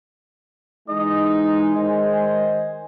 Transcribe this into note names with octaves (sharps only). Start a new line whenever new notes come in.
E3 G#3 D#4 D#5
D#3 C5 D#5 G#5